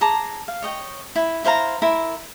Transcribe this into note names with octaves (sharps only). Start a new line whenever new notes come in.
G#4 A5 A#5 D6
F5
C#5 D#5 G5
E4
E4 C5 F5 A#5
E4 A#4 C6